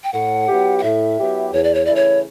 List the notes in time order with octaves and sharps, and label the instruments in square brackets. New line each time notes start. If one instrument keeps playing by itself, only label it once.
[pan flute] G5
[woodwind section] A2 [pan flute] F#5
[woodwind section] F#3 B3 E4 G4
[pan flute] F#5
[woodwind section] A2 [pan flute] E5
[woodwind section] F#3 B3 E4 G4
[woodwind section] E2 [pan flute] C#5
[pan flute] D5
C#5
[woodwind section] C#3 E3 A3 E4 [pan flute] D5
[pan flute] C#5